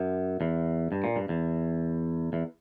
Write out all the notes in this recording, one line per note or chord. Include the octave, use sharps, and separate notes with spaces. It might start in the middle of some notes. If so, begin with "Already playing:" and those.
Already playing: F#2
E2
G2
A#2
G2
E2
E2